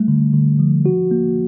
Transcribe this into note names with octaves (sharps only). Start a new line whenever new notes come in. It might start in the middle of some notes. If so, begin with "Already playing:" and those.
Already playing: G3 A3
D3
D3
F3
F#4
A#3